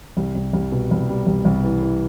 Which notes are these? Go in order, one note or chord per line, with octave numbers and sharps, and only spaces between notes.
C2
C2
C2
B2
C2
G3
C2
C2
E3
E3